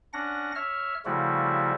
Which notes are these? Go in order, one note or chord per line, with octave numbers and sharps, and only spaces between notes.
C#4 D4 F#5 A#6
C#5 E5 F6
C#3 F3 G3 A3 E4 F#4